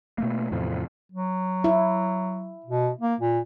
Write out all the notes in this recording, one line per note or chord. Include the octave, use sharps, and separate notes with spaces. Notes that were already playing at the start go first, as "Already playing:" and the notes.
B2 A3 A#3
E2 A2 C3 F3
F#3
E4
B2
A#3
A#2